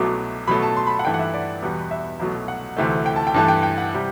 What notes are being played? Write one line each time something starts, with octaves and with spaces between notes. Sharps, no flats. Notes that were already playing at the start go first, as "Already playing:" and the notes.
Already playing: C2 B2 F#3 A3 D6
B2 F#3 A3 B5
A5
C6
B5
A5
F#5
G2 E3 A3 G5
F#5
E5
D5
E2 B2 G3 B3
E5
C2 B2 F#3 A3
F#5
D2 C3 E3 A3
G5
A5
G5
G2 E3 A3 A5
G5
G5
F#5
C3 G3